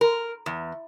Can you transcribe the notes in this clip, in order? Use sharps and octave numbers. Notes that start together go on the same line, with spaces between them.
A#4
E2